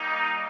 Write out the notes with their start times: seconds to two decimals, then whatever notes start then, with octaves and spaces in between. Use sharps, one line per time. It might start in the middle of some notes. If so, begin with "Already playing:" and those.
Already playing: G3 A#3 D#4